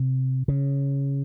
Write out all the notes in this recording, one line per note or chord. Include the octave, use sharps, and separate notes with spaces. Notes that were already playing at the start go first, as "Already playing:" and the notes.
Already playing: C3
C#3